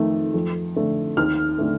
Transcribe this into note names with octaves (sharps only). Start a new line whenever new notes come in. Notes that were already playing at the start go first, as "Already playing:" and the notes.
Already playing: F2 D#3 A3
F2
D3 A3
D#2 F6
D3 A3